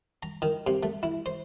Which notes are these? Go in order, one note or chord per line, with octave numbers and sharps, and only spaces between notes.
A#5
D#3
C3
A3
E4
C5